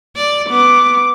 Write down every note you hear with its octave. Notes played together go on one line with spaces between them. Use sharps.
D5
B3 D6